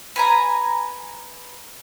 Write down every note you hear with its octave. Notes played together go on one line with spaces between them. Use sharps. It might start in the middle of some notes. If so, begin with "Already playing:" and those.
B4 G#5 A#5